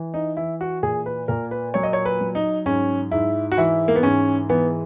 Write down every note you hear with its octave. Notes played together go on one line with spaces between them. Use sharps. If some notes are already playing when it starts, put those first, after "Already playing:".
Already playing: E3
D#4
E3 E4
F#4
A#2 G#4
B4
A#2 A#4
B4
F#3 C#5
D#5
C#5
B4
F#3
D#4
G#2 C#4
G#2 E4
F#4
E3 E4
A#3
B3
G#2 C#4
E3 B3